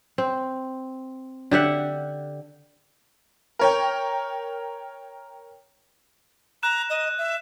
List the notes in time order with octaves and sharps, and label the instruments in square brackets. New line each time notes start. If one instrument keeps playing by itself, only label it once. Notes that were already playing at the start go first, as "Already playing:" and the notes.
[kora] C4
D3 G4 E5 F#5
[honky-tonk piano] A#4 C#5 G5
[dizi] A#5 [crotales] F#6 E7
[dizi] D#5
E5